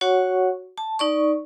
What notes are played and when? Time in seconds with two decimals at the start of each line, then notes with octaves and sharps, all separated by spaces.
0.01 F#4 C#5 F#5 C#6
0.78 A5
0.99 D#4 D5 C#6